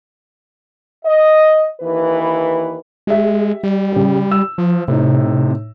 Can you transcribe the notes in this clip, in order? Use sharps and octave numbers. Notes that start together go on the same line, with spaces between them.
D#5
D#2 E3 B4
G#3 G4 E5
G3
C#3 G4
E6
F3
A2 C3 D#4